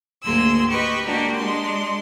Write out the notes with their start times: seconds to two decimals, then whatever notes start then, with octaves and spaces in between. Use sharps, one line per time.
0.25 D2 G#2 A#3 G#4 C6 E6
0.69 G4 B4 D#5 B5 C#6
1.05 G#3 A#3 D4 F#4 G4 A#4
1.36 G#3 D4 C6